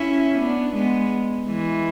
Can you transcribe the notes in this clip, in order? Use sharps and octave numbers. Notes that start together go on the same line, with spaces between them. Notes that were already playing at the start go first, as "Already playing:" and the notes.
Already playing: C#4 E4
B3 D4
G#3 B3
E3 G#3